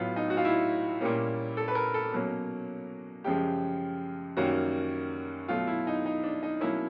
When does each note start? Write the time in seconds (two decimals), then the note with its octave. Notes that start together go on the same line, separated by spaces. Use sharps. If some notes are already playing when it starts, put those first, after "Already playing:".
Already playing: A2 F#3 B3 F4
0.16 D#4
0.30 F#4
0.37 F4
0.45 E4
1.01 A#2 G3 A#3 C#4
1.57 A4
1.68 B4
1.75 A#4
1.94 A4
2.12 B2 F#3 A#3 C#4
3.24 F#2 C#3 F3 G#3 G4
4.37 F#2 D#3 G3 A#3 C#4 F#4
5.48 B2 F#3 A3 F4
5.67 E4
5.87 D#4
6.06 D#4
6.24 D4
6.43 D#4
6.61 B2 F#3 A#3 C#4 E4